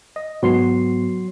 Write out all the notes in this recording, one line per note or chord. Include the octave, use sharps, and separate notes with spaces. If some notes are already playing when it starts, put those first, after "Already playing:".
D#5
G#2 F#3 B3 F#4 C6 C7